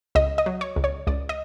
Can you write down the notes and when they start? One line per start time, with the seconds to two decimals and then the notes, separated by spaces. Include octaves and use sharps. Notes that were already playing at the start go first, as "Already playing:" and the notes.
0.15 C#2 D#5
0.38 D#5
0.46 F#3
0.61 C#5
0.76 C#2
0.84 C#5
1.07 C#2 D5
1.29 D#5